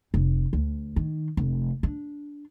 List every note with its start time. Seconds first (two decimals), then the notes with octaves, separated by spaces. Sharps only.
0.14 F1
0.53 D2
0.96 D#3
1.37 F1
1.83 D4